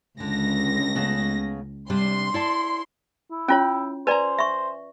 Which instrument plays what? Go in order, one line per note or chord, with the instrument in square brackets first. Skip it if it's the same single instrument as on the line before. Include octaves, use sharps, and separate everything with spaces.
[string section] C#2 A#6 [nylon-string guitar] D3
[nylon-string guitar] C#3 A3 B3
[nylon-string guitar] C3 G3 D4 [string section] C6
[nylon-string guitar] E4 D5 A5
[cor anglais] E4
[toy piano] C#4 F4 C#5 [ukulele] G5
[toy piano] B4 D5 [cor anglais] C5 [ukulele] G#5 A#5
[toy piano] E5 C#6